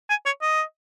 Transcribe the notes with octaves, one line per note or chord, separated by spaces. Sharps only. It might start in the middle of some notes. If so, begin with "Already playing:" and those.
G#5
C#5
D#5